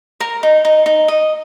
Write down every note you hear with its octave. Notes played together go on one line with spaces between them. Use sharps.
A#4 A#5
D#4
D#4
D#4
D#5